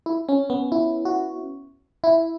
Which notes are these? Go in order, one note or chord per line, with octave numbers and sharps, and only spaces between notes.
E4
C#4
B3
E4
F#4
E4